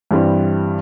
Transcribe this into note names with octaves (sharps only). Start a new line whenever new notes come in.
G2 E3 G3 C4